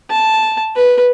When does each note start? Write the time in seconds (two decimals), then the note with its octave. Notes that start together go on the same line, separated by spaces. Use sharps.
0.10 A5
0.76 B4